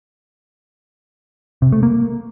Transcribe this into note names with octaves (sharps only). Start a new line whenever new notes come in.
C3
A3
A#3